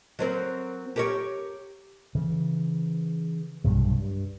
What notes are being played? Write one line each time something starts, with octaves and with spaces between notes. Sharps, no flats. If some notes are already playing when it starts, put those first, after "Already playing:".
F#3 C4 A#4
G4 A#4 C#5
C#3 E3
B1 G2 C3
G2